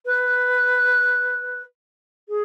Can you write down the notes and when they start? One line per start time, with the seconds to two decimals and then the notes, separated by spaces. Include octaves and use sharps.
0.05 B4
2.29 G#4